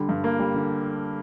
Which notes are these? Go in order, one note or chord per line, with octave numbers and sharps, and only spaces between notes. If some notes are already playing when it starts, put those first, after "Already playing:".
Already playing: D3 G3
G2
A#3
G3
D3